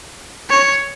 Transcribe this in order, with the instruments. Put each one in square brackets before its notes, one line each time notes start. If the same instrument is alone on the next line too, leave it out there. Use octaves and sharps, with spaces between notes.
[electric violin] C#5